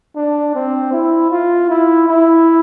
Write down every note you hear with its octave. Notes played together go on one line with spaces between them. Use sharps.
D4
C4
E4
F4
E4
E4